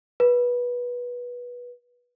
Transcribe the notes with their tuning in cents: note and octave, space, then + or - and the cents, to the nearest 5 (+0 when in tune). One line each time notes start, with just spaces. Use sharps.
B4 -20